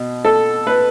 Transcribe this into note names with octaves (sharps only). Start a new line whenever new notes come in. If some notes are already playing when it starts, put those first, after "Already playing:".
Already playing: B2
A4
B4